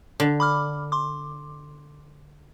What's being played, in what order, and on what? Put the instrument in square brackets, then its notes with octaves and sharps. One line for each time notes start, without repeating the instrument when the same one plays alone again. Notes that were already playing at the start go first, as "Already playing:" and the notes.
[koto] D3
[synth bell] B5 D6 F6
C6 D6